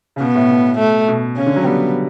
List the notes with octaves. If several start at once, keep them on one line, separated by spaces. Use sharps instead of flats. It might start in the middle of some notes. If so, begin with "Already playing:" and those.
C#3
B2 B3
A2
B2
A3
B2
C#3 C#4
D3
F#3
G3 B3